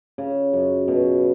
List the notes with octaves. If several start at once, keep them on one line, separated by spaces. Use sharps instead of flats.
C#3
F#2
B2